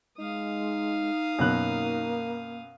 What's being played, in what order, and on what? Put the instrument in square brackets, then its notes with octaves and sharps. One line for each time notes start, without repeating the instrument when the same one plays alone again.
[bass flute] G#3 [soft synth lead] D#4 [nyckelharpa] F5 D#6
[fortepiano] F#2 B2 F#6 [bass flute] A#3